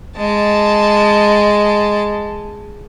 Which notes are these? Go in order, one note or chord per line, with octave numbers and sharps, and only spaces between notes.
G#3 A5